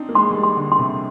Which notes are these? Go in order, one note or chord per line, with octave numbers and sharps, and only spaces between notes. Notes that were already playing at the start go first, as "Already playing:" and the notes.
Already playing: C4 D4 D#4
A#3
G#3 C6
G3
G#3
C6
D3
C6
C3